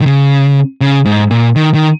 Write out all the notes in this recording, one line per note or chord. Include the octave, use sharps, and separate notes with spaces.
D#3
C#3
C#3
G#2
A#2
D#3
D#3